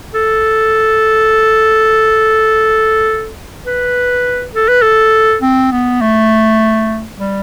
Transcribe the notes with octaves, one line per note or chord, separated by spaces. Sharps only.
A4
B4
A4
B4
A4
C4
B3
A3
G3